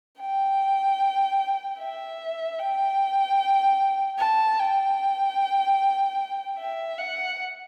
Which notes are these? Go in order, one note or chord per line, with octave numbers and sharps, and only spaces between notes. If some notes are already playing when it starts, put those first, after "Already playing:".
G5
E5
G5
A5
G5
E5
F#5